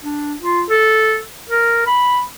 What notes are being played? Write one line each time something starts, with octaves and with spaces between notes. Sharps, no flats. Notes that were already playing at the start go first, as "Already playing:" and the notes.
D4
F4
A4
A#4
B5